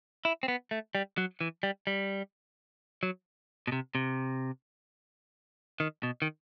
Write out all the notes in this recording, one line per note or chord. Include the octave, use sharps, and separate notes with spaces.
E4
C4
B3
A3
G3
F#3
E3
G3
G3
F#3
B2
C3
C3
D#3
B2
D#3